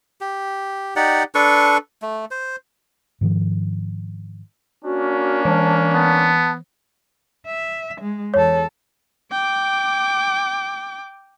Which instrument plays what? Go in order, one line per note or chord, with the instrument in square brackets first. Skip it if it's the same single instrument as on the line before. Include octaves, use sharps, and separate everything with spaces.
[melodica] G4
D#4 G4 D5 F#5
D4 A4 B4 C#6
A3
C5
[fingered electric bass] G#2 D#3 F3
[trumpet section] A#3 C#4 D4 [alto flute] F#4
[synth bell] E3 [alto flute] A5
[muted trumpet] B3 [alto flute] A5
[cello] E5
G#3
[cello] E2 A4 [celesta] C#5
[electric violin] G5 D6